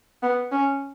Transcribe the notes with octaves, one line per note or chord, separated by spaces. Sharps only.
B3
C#4